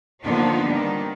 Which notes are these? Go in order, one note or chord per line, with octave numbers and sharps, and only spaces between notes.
D3 D#3 F3 A#3 B3 D4
D#3 G3